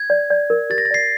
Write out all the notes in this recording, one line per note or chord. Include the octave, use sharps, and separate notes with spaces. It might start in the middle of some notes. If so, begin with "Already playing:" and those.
Already playing: G#6
D5
D5
A#4
G4 A6
A#6
A6
D5 C7